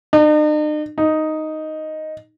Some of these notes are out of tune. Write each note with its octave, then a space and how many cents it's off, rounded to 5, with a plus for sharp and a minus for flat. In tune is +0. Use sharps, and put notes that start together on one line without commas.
D#4 -45
D#4 +0